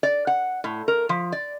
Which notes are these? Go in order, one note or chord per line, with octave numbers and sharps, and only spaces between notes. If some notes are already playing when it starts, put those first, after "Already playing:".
D5
F#5
A2
A#4
F3
D5